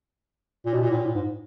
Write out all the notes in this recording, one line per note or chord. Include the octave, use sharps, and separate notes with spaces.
A#2
B2
A#2
A2
A#2
A2
G#2